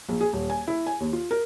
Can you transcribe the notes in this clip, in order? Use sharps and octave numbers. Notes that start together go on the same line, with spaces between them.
A#1
G#4
D#1
G#5
E4
G#5
D#2
F4
A#4